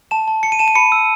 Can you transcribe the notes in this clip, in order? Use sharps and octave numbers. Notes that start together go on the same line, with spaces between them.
A5 E7
A5
A5 C#7
D#7
A5 E7
D#7
B5 C#7
E6